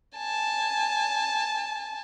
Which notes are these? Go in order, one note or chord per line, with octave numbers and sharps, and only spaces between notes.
G#5 A5